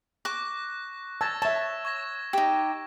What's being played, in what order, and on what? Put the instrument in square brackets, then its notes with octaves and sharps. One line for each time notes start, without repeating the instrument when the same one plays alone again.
[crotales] C#6 F#6 A#6 [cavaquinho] D6
[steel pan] A5 [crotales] E6 G#6 A#6
[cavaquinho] C#5 [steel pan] E5 A5 [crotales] E7
[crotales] C#6 G#6 A#6
[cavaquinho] D#4 G4